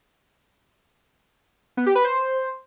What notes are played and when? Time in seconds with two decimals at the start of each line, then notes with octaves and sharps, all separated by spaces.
1.77 B3
1.86 G4
1.95 B4
2.04 C5